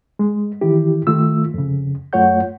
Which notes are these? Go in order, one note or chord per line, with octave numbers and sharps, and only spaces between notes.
G#3
D#3 E3 E4 G4
D#3 A3 F4 E6
F2 C#3
F#2 A3 F4 C#5 F#5 G6